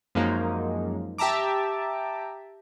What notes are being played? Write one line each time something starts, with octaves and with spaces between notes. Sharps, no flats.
F#2 F3 G#3 A#3 D#4
G4 E5 A5 A#5 D6